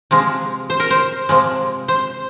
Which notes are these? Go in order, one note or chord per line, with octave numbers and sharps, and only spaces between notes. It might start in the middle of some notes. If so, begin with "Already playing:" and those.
C3 F3 G#3
C5
A#4
C5
C3 F3 G#3
C5